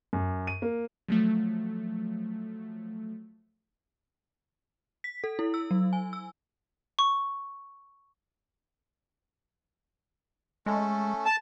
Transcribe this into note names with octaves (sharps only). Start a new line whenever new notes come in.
F#2
D#7
A#3
F3 F#3 A3
B6
A4
E4
E6
F#3
G#5
E6
C#6
G#3 A3 C#4 A4
A5